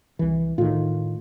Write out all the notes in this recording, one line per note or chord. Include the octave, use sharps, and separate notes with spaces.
C2 E3
A2 D#3 F4